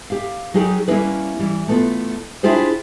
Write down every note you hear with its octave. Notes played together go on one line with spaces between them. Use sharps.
G4 F5
F#3 D#4 G4 G#4 A#4
G3 A#3 C#4 E4 G#4 B4
E3 G3
A3 B3 F4
D4 E4 F4 G4 G#4 C5